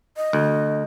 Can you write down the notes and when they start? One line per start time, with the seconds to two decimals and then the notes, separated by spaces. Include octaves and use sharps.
0.17 D#5
0.33 D2